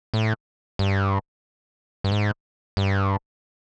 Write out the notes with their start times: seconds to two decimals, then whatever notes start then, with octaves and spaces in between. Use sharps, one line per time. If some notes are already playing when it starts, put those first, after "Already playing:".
0.14 A2
0.79 G2
2.04 G2
2.11 G#2
2.77 G2